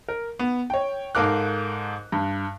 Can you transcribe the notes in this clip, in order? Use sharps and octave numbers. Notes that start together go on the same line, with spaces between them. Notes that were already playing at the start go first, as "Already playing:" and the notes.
A#4
B3
C#5 G5
G#2 A4 A#4 F5 D6 F#6
G2